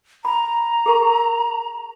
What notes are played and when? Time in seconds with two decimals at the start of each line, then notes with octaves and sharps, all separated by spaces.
0.25 A#5 B5
0.86 G#4 A#4 C#6